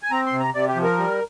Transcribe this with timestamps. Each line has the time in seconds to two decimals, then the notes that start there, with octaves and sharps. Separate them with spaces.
0.03 G#5
0.11 C4 A#5
0.26 C6
0.32 C3
0.40 A#5
0.54 C3 D5
0.69 G4
0.75 F3
0.83 A#4
0.98 G3